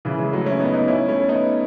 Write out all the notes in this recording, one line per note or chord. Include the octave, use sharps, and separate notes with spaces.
C#3 E3
E3 G#3
F#3 A3
C#4 E4
B3 D#4
B3 D#4
C#4 E4
A3 C#4
B3 D#4